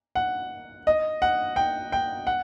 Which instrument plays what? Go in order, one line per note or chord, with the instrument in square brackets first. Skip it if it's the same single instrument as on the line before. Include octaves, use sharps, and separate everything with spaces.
[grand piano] F#5
D#5
F#5
G5
G5
F#5